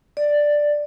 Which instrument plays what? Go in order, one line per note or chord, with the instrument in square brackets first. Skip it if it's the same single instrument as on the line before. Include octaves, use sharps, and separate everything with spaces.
[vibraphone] D5